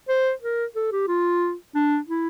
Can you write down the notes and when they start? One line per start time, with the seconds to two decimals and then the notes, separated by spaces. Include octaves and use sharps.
0.09 C5
0.42 A#4
0.76 A4
0.92 G4
1.08 F4
1.75 D4
2.08 E4